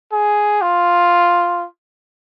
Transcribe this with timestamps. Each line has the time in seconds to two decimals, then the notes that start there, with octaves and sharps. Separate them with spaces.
0.12 G#4
0.62 F4